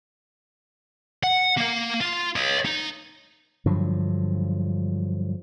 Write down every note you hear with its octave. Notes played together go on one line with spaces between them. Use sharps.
F#5
A#3 F5
F4
C#5 D#5
D#4
G2 D3 F3 F#3